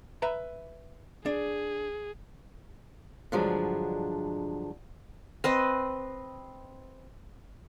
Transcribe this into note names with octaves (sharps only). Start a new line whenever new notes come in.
B4 E5 A#5
D4 G#4
G2 D3 F3 F#3 G#3 D4
C4 B4 D#5